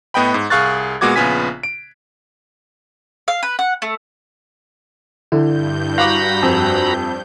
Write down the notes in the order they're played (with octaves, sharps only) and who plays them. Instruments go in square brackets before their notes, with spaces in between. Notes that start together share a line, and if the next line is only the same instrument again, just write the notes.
[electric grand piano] A2 B3 D#5 G5 B5
G#2
C2 G#4 F5 C#6 F#6 A6
A#2 G#3 B3 F#4 D6 G#6
A#1 C#3 B3 F4 G#5 B6
D7
[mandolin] F5
B4
F#5
A3
[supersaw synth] G2 G6 [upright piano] D3 [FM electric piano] E4
[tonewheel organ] F#4 A#5 B5 [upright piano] F5 C#6 D6
[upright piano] F2 [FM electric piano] G#5 E6